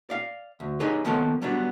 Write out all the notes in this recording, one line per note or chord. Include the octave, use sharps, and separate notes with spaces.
D5 F5
D2
D#4 G4 G#4 B4 C#5 D5
D#3 F3 A#3 B3 A4 C#5
F#3 G3 B3 D4